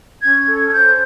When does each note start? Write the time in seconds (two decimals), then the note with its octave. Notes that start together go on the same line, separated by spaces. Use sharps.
0.22 C#4 G#6
0.48 A4
0.68 G#6
0.72 C5 G6